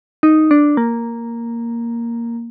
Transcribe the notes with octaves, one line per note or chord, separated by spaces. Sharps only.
D#4
D4
A#3